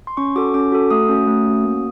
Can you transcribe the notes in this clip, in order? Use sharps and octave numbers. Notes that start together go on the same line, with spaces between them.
C6
C#4 C#6
F#4 A4 D6
C#4 D6
F#4 A4
A3 D#6
C#4 F#4
A3
C#4 F#4
A#3